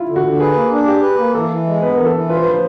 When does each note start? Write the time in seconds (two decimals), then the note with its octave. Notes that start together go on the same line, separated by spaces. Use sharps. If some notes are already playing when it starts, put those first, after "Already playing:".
Already playing: E4 F4
0.09 D3
0.16 F#4
0.24 D3
0.40 G#4 B4
0.55 A#3
0.72 D4
0.87 G4
1.03 B4
1.19 A#3
1.35 E3 A4
1.50 E3
1.67 G#3
1.81 B3 B4
1.97 E3 A#4
2.06 A4
2.13 E3
2.29 F4 B4
2.36 C5
2.44 F3 B4
2.51 C5